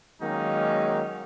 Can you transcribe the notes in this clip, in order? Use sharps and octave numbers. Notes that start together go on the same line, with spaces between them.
D#3 F#3 G#3 A#3 C#4 D#4